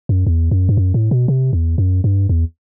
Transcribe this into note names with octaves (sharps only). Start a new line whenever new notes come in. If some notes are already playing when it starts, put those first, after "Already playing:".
F#2
E2
F#2
G2
F#2
A2
B2
C3
E2
F#2
G2
E2